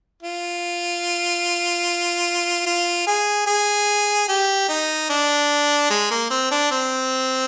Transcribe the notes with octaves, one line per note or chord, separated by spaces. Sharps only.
F4
F4
G#4
G#4
G4
D#4
D4
G#3
A#3
C4
D4
C4